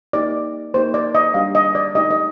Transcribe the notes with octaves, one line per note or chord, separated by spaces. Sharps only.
A#3 D#4 G4 D5
A#3 D#4 G4 C5
D5
D#5
G3 D4 G4 F5
D#5
D5
A3 D#4 G4 D#5
D#5